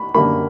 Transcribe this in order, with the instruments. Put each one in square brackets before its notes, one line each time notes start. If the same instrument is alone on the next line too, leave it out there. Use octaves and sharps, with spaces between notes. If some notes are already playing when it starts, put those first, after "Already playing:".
Already playing: [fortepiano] B5
F#2 D3 G3 A#3 B5